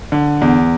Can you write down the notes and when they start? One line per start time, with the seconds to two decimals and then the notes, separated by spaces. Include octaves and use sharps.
0.12 D3
0.41 E2